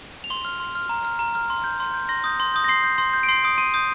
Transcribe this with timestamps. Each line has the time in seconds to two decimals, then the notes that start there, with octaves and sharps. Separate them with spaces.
0.24 F7
0.30 C6 G7
0.45 F6
0.60 C6
0.75 F6
0.89 A#5
1.05 F6
1.19 A#5
1.35 F6
1.50 C6
1.64 G6
1.80 C6
1.94 G6
2.09 C6 A#6
2.24 D#6 G6
2.40 C6
2.54 D#6 G6
2.64 A#6
2.68 C6 C7
2.84 G6
2.98 C6
3.13 G6
3.23 D7
3.28 C6 C7
3.44 D#6 G6 D7
3.58 C6 D#7
3.74 D#6 G6